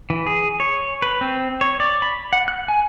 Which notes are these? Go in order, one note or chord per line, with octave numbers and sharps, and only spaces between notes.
E3
G#4
C#5
B4
C4
C#5
D5
B5
F#5
F#6
G#5